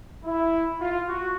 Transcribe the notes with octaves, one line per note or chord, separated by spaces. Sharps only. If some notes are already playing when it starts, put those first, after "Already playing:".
E4
F4
F#4